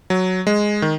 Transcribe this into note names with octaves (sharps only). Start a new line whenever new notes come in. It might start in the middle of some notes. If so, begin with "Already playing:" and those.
F#3
G#3
D#3